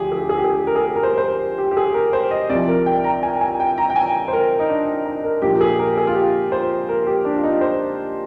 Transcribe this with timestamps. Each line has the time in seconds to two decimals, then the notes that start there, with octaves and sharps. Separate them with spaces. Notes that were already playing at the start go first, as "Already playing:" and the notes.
Already playing: D2 D3 F3 G4 G#4
0.12 G#4
0.29 G#4
0.37 G4
0.44 G#4
0.67 A#4
0.75 G#4
0.84 A#4
0.96 A#4
1.03 C5
1.18 C5
1.21 A#4
1.58 G4
1.71 G4
1.77 G#4
1.94 A#4
2.13 C5
2.31 D#5
2.49 C2 C3 F3 D5
2.68 A#4
2.86 G5
3.04 A#5
3.23 G#5
3.41 G#5
3.60 G5
3.78 A#5
3.90 G5
3.96 G#5
4.28 C5
4.33 A#4
4.59 D#4
4.69 D4
4.87 D#4
5.05 D#4
5.24 A#4
5.42 A#1 A#2 F3 G4
5.55 A#4
5.61 G#4
5.79 A#4
5.98 G#4
6.07 F4
6.15 G4
6.52 C5
6.89 A#4
7.06 G4
7.25 D4
7.36 F4
7.44 D#4
7.61 C5